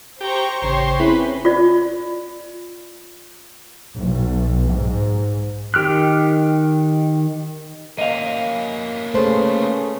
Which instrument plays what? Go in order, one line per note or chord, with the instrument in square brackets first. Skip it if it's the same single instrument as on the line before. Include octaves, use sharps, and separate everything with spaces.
[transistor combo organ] G4 [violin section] C5 A#5 C#6
[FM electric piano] A1 C#3 A#6 [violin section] G4 C#5 [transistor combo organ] C5
[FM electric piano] C4 E4 G#4 [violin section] C#4 [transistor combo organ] B4
[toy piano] F4 D5
[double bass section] B1
G#2
[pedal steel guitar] D#3 G4 F6 F#6
[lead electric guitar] A#3 C#4 [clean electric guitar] D#5 F5
[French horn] C#3 [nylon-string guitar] A3 B4 C5